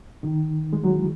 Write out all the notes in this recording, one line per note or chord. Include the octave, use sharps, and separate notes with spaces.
D#3
G#3
F#3
E3